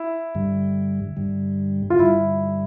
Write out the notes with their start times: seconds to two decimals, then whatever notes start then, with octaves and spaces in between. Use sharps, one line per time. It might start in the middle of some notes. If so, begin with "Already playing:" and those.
Already playing: E4
0.35 G2 D3 G3
1.17 G2 D3 G3
1.90 F4
1.99 G2 D3 G3 E4